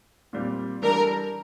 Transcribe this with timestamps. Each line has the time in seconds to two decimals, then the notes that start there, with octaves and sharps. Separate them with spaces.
0.33 A#2 G3 C4
0.82 E3 G3 D4 A4 A#4